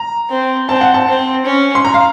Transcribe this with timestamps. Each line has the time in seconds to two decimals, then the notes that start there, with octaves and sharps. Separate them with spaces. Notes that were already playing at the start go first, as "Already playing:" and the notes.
Already playing: A#5
0.30 C4
0.69 C4 A5
0.81 F#5
0.94 A5
1.07 C4
1.46 C#4
1.75 C6
1.85 A#5
1.94 F5